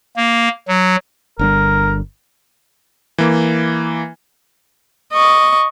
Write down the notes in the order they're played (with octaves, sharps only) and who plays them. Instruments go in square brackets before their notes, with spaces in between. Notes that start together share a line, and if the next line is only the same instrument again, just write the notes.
[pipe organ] A#3
F#3
[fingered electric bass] G1 D3 G3 [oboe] A#4
[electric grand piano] E3 A#3
[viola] D#5 C#6